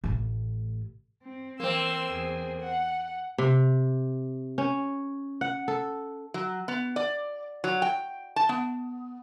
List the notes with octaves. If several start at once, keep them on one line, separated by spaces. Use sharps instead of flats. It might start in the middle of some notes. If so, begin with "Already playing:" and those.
A1 E4
C4
E3 A#3 C4 C6 E6
E2 G#4
F#5
C3
C#4
F#5
A4
F#3
B3
D5
F#3
G5
A5
B3